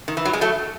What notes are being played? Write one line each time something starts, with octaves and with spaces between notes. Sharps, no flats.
D#3
E3
F#3
G#3
F#3 A3